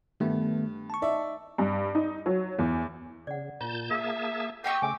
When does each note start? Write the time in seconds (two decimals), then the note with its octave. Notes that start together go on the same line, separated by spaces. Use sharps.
0.20 G2 D#3 A3 B3
0.90 A5 C#6
1.02 D#4 D5 E5
1.58 G2
1.95 D#4
2.26 F#3
2.59 E2
3.27 C#3 D5 F#5
3.61 A#2 F4 A5 G6
3.90 A#3 G#4 E5 A5
4.64 G4 D#5 F5 G5 C#6 E6
4.82 C#3 A3 G#5 D6